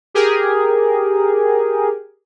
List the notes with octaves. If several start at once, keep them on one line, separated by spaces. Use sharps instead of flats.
G4 G#4 A#4